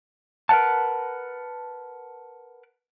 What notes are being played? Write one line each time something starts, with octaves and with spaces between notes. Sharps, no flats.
A#4 B4 C#5 F#5 A5